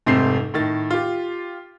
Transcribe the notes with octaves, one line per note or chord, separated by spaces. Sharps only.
F1 G#2 C3 A3 C4 C7
A2 D#3 A6
F4 G4